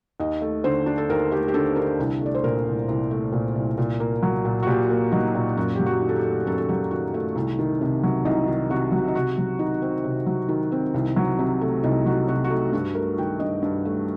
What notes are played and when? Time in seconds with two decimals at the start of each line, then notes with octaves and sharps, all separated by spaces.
0.20 D#2 D#5
0.41 A3
0.64 D3 C5
0.86 D4
0.98 A4
1.09 D#2 A#4
1.31 A3 G4
1.48 G4
1.54 D3 A4
1.76 D4 A#4
1.99 C2
2.21 A3 D5
2.35 C5
2.44 A#2 A#4
2.66 C2
2.88 C2
3.11 A3
3.33 A#2
3.56 C2
3.78 A#2
4.00 A#3
4.23 F#3
4.45 A#2
4.63 F#4
4.67 A#2 G4
4.90 A#3
5.12 F#3 D#4
5.35 A#2
5.57 F#2 F#4
5.75 F#3 G4
5.86 F#4
6.01 D#3
6.09 A4
6.16 G4
6.25 A3
6.46 F#2 A4
6.58 A4
6.69 F#3 G4
6.91 D#3 F#4
7.14 A3
7.35 C2
7.59 D#3
7.81 C3
8.03 F#3
8.25 C2 D#4
8.47 D#3
8.70 C3 F#4
8.92 F#3
9.08 D#4
9.15 C3 F#4
9.38 F#3
9.59 D#3 D#4
9.82 C4
10.04 C3
10.26 F#3
10.49 D#3
10.72 C4
10.94 C2
11.16 F#3
11.39 C3
11.61 A3
11.83 C2 D#4
12.06 F#3 F#4
12.28 C3 F#4
12.44 F#4
12.50 A3 D#4
12.72 G2 F#4
12.95 A3 A#4
13.18 D#3 G5
13.40 G2 D#5
13.62 G2
13.85 A3